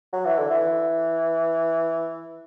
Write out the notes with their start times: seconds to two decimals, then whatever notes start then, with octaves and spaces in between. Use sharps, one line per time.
0.13 F#3
0.25 E3
0.37 D3
0.50 E3